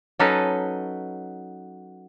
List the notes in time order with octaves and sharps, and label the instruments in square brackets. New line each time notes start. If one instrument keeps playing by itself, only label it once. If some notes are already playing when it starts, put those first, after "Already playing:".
[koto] F#3 C#4 D#4 A4 B4 D#5